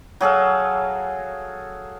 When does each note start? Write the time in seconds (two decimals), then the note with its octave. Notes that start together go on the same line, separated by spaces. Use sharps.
0.21 F#3 G#4 A4 F5